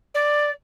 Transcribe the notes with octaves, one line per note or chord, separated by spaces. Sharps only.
D5